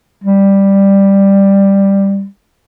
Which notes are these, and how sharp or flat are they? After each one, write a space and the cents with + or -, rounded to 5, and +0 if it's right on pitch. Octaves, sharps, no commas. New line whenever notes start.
G3 +5